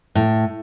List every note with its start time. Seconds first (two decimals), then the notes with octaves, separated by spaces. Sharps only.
0.15 A2